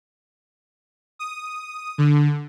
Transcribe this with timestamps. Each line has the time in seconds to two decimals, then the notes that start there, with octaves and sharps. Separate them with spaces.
1.19 D#6
1.98 D3